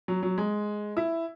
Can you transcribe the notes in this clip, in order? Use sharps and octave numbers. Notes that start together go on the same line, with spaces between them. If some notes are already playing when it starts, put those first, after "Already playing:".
F#3
F#3
G#3
E4